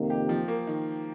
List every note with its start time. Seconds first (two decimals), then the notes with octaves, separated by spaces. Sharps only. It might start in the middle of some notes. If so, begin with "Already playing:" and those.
Already playing: F2 C3 D#3 A#3
0.10 G4
0.29 F3
0.48 A#3
0.67 D#3